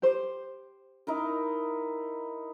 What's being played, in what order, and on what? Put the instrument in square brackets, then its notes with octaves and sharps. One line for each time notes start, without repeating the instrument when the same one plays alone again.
[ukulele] G4 C5
[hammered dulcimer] D#4 E4 A#4